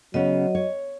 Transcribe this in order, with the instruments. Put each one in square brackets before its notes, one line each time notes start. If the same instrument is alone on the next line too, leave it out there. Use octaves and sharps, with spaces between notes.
[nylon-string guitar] C#3 B3 C#4 [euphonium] F#3 [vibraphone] D#5
[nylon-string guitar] C#5